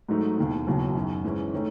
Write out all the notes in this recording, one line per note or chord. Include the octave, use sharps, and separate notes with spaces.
G#2 F#3 A3 D#4
E1 D#2 D#3
E1 D#2 C#3 F#3
F#2 D#3 F#3
G#2 E3 G#3 C#4
D#3 A3 C#4